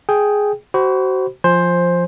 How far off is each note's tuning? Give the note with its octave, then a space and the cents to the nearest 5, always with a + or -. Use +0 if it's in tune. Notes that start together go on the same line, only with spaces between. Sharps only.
G#4 +5 G5 +0
F#4 +30 C5 +0 B5 +0
F3 +0 C5 +10 G#5 +0